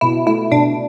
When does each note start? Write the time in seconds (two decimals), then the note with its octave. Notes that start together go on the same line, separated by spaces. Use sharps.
0.01 B2 E4
0.26 A3 E4
0.51 B2 D4